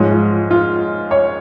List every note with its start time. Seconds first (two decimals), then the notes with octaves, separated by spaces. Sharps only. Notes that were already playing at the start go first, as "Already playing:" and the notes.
Already playing: G#2 F3 G#3 C#5
0.11 F4
0.51 F4
1.11 C#5